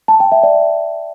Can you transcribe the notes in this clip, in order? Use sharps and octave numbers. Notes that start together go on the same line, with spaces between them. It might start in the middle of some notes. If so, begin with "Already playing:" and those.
A5
G5
E5
D5